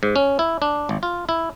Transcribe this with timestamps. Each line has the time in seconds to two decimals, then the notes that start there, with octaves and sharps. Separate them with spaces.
0.03 G#2
0.16 C#4
0.39 E4
0.62 D4
0.89 G#1
1.03 F4
1.29 E4